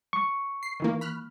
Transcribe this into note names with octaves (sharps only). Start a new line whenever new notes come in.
C#6
C7
D#3 E3 A#3
B5 F6 F#6